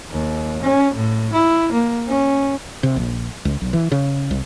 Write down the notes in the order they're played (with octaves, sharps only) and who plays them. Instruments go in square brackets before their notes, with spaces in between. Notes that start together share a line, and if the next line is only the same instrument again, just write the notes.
[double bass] D#2
C#4
A2
E4
A#3
C#4
[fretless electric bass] C3
A#1
C#2
B1
E3
C#3
C2